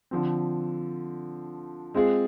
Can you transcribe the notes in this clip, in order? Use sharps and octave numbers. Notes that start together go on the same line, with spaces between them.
D3 F3 C4
G#3 C4 F4 G#4